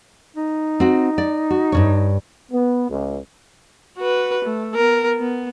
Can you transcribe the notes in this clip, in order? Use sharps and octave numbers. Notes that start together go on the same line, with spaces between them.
D#4
C4 F#4
D5
F#4
G2 C#3 C#5
B3
C#2
F#4 B4
A3
B3 A#4
B3